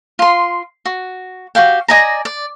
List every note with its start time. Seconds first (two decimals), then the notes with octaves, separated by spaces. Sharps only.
0.19 F4 C6
0.86 F#4
1.55 F#4 G4 F5 G5
1.88 D5 D#5 G#5 A#5
2.25 D5